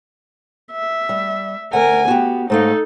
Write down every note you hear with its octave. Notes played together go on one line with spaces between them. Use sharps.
E5
G3
D2 A#4 F#5 G#5
B3 F#4 G4
G#2 A3 D#4 A4 F5